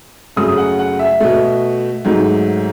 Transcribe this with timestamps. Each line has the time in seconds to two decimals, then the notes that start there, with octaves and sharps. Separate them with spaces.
0.36 F#2 C#3 F#3 A3 D#6
0.57 F#5
0.79 F#5
0.99 E5
1.20 B2 A3
2.05 G#2 F#3 A3